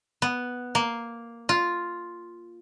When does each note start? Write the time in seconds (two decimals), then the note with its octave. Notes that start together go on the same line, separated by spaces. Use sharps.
0.22 B3
0.75 A#3
1.49 F4